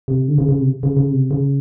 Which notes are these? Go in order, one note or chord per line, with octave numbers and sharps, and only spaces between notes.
C3
D3
C#3
C#3
C3
C#3
C#3
C3
C#3